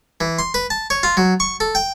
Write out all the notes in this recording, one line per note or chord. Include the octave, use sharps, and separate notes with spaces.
E3
C6
B4
A5
C#5
F4
F#3
C#6
A4
G5